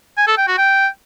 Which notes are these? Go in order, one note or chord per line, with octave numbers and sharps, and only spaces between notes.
G#5
A4
G5
F#4
G5